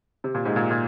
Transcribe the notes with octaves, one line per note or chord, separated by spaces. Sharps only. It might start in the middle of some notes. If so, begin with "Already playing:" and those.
C3
A#2
G#2
A#2
A#2